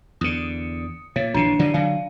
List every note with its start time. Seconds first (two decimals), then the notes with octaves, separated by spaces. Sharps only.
0.21 E2 D3 D#6 C#7
1.16 A#2 C#5
1.34 A#1 D3 E3 D4 C7 C#7
1.59 D3 E3 G3 D5 D#7
1.74 D3 F#3 F5